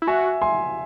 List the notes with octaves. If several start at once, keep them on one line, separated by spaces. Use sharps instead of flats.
E4
F#4 E5 G#5
G#5 C6